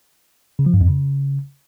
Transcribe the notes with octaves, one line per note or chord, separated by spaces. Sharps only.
C#3
F3
G2
F2
C#3